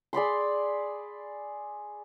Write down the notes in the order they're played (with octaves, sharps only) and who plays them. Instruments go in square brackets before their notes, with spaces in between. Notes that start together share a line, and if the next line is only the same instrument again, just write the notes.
[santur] G#4 D5 B5 C6